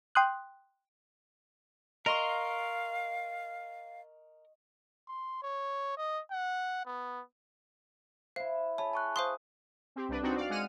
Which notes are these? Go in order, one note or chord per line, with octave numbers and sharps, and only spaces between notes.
G5 C6 D#6 F#6
A#4 D#5 F5 C6 C#6
C6
C#5
D#5
F#5
B3
E4 C5 E5 F5
G#4 C#5 A5 B5
A5 C#6 F#6
B4 C5 F5 C6 D#6
C4 G4
C2 D4 B4
C4 D4 D#4 F#4
D5 F5
G#3 F#5 F6 D#7